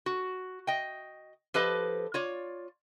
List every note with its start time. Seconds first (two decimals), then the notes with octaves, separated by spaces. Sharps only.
0.06 F#4
0.67 D#5 G5
1.54 F3 G4 A4 B4 C5 D#5
2.14 F4 C#5 D5